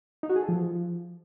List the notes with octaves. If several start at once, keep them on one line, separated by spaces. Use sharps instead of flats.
D#4
F#4
G#4
A4
F3